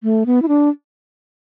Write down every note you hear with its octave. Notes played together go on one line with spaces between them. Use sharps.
A3
B3
E4
D4